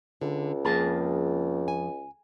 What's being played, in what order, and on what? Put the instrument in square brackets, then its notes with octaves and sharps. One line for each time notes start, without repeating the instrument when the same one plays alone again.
[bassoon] C#2 [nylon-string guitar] D3
[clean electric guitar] F2 A5 [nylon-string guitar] A#3 G#4
[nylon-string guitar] G#5